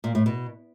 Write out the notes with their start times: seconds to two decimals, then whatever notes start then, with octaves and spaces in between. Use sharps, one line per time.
0.04 A#2
0.15 A2
0.26 B2